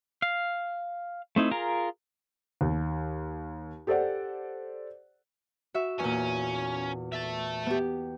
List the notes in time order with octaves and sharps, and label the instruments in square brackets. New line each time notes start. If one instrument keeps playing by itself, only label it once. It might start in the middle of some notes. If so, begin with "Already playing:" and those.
[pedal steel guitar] F5
A3 C4 D#4 E4
F4 G#4 A#4 A#5
[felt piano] D#2
G4 A4 C5 D5 F#5
[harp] F#4 E5
[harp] E2 A#2 [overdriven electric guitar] C#4
[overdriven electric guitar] E5 A5
[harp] B3 G4